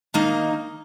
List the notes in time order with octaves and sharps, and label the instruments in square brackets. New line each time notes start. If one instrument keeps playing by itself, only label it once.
[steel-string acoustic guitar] D#3 A#3 D#4